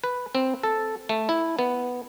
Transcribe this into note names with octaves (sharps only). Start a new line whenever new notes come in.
B4
C4
A4
A3
E4
B3